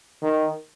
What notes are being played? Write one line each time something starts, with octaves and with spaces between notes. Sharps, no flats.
D#3